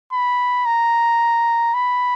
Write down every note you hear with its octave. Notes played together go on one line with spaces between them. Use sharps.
B5
A#5
B5